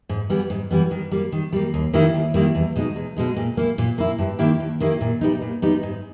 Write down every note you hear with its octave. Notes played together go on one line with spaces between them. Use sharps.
G#2
E3 G3 B3
G#2
E3 G3 B3
D#3
G3 A#3
D#3
G3 A#3
D#2
D#3 G3 A#3 E4
D#2
D#3 G3 A#3 E4
E2
B2 G#3 D#4
E2
B2 G#3 D#4
A#2
A#3 E4
A#2
A#3 E4
G2
D#3 A#3 E4 G4
G2
D#3 A#3 E4 G4
A#2
G3 B3 D#4
A#2
G3 B3 D#4
G#2